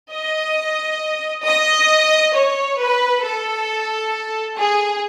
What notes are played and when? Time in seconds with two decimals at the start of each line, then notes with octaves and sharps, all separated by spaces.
0.12 D#5
1.45 D#5
2.35 C#5
2.80 B4
3.24 A4
4.57 G#4